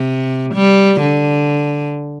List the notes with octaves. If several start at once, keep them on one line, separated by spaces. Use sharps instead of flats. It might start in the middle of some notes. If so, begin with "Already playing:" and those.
Already playing: C3
G3
D3